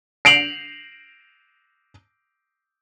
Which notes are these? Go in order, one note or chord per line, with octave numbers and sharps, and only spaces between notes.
C7 D7 F7 F#7